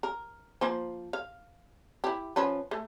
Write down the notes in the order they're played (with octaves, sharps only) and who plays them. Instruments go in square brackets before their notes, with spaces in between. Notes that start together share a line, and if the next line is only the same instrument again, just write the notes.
[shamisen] A#4
F3 A#3 C5
F5
E4 G4
F3 C#4 B4
A3